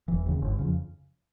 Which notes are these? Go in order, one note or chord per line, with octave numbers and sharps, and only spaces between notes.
E1 E3
D#2 C#3
G1
F2 C#3